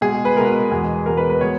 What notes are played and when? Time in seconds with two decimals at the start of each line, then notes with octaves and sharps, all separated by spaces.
0.01 B2 G#3 G#4
0.25 B4
0.36 B2 G#3 A#4
0.71 E2 B2 G#3 G#4
1.06 E2 B2 G#3 A#4
1.17 B4
1.30 B4
1.41 B2 G#3 C#5